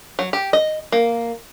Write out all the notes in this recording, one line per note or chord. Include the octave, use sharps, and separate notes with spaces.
F#3
G4
D#5
A#3